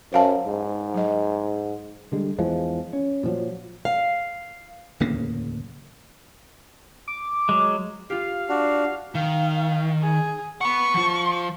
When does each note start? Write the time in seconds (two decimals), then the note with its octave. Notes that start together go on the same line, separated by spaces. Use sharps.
0.13 F#2 C5 F5 A5
0.47 G#2
0.94 F#3 D#5
2.12 D3 G3 G#3
2.38 E2 E3 F3 G#3
2.93 C#4
3.23 A#2 F3 F#3
3.85 F5
5.00 D1 E2 C#3 A#3
7.08 D6
7.49 F#3 G#3
8.10 F4 G4 F5
8.49 D4 F#4
9.15 D#3 F5
10.02 G#4
10.61 F#5 B5 C#6
10.94 F3 F4